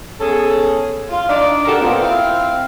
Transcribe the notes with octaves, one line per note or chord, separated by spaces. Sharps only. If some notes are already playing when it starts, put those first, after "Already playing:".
B3 C#4 G#4 A4
F4
D4 D#4 D5
F#4 G4 A4 A#4
A#2 B3 C4 F4
C4 E4 F5